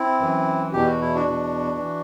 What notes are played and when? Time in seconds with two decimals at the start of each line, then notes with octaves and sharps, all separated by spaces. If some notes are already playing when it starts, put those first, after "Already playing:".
Already playing: C4 E4
0.20 F#2 E3
0.73 E2 B2 G4
0.86 F#4
1.01 E4
1.15 D4 F#4
1.25 E2 B2
1.78 E3